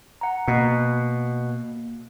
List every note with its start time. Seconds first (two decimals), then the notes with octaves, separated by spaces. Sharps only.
0.21 F#5 A#5
0.48 B2 A#3